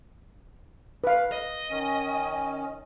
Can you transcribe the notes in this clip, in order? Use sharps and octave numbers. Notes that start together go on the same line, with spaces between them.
B4 F5
D#5
D#3 C#4